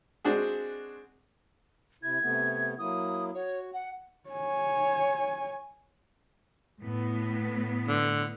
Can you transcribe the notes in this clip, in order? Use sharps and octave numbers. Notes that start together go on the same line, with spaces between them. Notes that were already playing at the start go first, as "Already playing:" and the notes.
G#3 C4 D4 F#4 G#4
C3 E4 G#6
C3 A3 B3
F#3 A#3 E4 D#6
F#4 C#5
F#5
C#5 G#5
A2 B3
D3